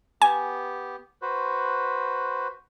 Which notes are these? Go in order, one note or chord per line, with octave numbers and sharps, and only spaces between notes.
B3 G4 G#5
F#4 B4 C5